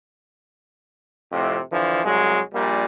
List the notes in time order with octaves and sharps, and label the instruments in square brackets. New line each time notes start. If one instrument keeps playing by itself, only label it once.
[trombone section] F2 A2 C3
D3 E3 F3
C2 F#3 G#3
A#1 A#2 G3